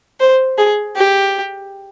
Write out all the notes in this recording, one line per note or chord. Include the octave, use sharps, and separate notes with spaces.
C5
G#4
G4